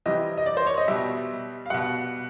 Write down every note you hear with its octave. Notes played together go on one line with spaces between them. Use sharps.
C3 E3 G3 D#5
D#5
D5
C5
C#5
D#5
B2 G3 E5
F5
B2 G3 F#5